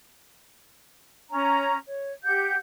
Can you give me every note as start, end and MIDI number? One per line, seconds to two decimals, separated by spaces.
1.30 1.76 61
1.30 1.76 73
1.30 1.76 82
1.87 2.11 73
2.24 2.55 67
2.24 2.55 78
2.24 2.55 91